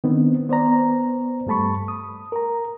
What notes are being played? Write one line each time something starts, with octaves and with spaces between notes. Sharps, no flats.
D#3 B3 C4 D4
B3 C5 D5 A#5
G2 G3 A3 A5 B5 C#6
D#6
A#4 A#5